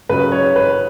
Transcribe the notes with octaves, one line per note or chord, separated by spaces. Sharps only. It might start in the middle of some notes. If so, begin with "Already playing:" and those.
C#3 F#3 B4
C#5
B4